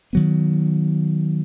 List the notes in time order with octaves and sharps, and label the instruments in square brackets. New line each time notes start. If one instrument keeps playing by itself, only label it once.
[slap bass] D#3 F#3 B3